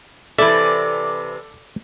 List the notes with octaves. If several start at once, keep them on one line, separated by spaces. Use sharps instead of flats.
C3 E3 E4 A4 D5 E5